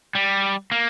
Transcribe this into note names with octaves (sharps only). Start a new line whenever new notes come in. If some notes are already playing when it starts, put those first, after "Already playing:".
G3
A#3